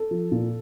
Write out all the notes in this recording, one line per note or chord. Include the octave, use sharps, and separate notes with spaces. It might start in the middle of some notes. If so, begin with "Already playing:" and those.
Already playing: A4
F3
A#2